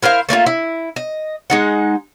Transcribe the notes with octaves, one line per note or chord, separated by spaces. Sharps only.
E4 A#4 C5 F5
A3 A#3 C#4 F4
E4
D#5
G#3 D#4 F#5